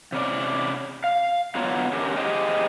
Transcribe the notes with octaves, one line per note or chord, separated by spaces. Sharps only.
C3 C#4 D5
F5
D3 F#3 B3 F4 C#5 A#5
C#4 G4 A#4
G4 G#4 C5 D#5 G5